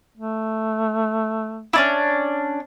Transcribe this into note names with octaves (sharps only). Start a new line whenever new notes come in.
A3
C#4 D4 E4